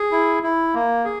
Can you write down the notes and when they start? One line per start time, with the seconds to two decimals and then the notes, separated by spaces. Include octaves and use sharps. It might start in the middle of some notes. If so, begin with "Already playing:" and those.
Already playing: G#4
0.11 E4
0.43 E4
0.74 A#3
1.05 G#4